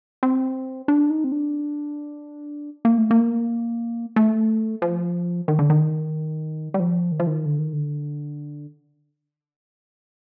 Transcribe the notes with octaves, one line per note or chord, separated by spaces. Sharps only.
C4
D4
D#4
C4
D4
A#3
A3
A#3
A3
F3
D#3
D3
D#3
G3
F3
D#3
F3
D#3
D3
D#3
D3